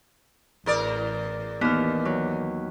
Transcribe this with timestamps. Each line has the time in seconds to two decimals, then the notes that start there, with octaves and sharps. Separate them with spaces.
0.66 A1 E2 A#4 D5
1.61 D#2 E3 B3 F6
2.05 F#3